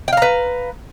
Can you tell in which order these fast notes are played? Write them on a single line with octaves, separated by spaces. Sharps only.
G5 F5 A#5 B4